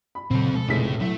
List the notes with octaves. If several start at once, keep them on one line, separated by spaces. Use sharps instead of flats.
B5
A#2 C#3 F#3 C4 A4
B2 F3 G#3 A4
F1 A2 C#3 B6
F#3 A3 E4